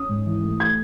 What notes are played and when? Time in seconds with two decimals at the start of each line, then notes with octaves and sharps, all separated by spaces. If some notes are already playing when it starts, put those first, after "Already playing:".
Already playing: C#4 D#6
0.09 G#2
0.26 E3
0.43 A3
0.60 A3 G#6